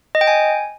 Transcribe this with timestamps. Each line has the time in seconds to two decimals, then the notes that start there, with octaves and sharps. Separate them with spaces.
0.15 D#5
0.21 G5
0.27 G#5